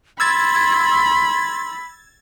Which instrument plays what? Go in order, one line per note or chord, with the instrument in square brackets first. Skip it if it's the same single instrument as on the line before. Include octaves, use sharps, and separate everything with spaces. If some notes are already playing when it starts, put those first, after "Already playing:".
[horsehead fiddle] B5 [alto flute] C6 [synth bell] E6 G#6 A6